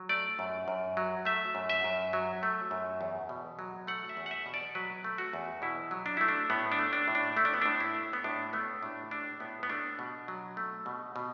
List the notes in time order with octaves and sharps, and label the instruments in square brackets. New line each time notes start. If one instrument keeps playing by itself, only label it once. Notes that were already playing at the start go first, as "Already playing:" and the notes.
Already playing: [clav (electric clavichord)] F#3
A3 D5
F#2
F#2
F#3
A3 E5
F#2
E5
F#2
F#3
A3
F#2
E2
B2
F#3
A3 F#5
E5
E2
F#5
E5
B2
D5
F#3 B4
A3
F#4
E2
B2 E4
F#3
D4
A3 E4
D4
A2 B3
D4
A3
D4
A2
D4
A3 E4
D4
B3
A2 D4
E4
A3
B3
A2 D4
A3 B3
A2 D4
A3 D4
A2 B3
B3
A3 D4
B2
F#3
A3
B2
B2